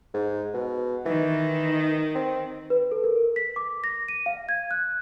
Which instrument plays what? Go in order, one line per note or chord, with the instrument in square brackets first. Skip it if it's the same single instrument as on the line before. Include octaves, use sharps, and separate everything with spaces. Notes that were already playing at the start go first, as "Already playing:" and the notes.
[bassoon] G#2
B2
[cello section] D#3 [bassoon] E3
[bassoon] C4
[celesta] B4
A4
A#4
B6
D6
A#6
D#7
F5
G#6
F#6